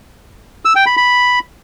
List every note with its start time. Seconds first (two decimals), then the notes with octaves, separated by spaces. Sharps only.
0.65 E6
0.76 G5
0.86 B5
0.97 B5